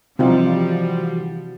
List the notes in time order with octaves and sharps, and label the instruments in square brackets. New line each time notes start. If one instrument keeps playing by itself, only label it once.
[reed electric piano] C3 [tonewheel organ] E3 F#4 [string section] F3 G3 [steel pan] C4 D#4 F4